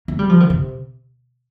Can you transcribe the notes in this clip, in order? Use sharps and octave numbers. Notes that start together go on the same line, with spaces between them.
A#3
G3
F3
D#3
C3